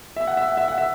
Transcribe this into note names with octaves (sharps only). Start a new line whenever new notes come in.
E5
F#5
E5
F#5
E5
F#5
E5